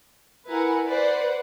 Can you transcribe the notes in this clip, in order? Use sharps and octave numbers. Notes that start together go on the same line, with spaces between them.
E4 A#4 B4 F#5 G#5 A#5
B4 C5 D5 F#5